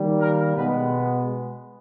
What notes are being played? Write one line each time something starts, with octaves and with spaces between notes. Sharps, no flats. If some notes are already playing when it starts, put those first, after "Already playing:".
Already playing: D#3 G3 A#3
A#4
B2 G#3 B3 B4